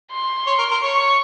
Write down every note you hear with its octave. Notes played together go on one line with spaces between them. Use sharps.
C6
C#5
A#4
A#4
C#5 C#6